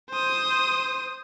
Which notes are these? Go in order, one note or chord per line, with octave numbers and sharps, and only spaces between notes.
C5 D#6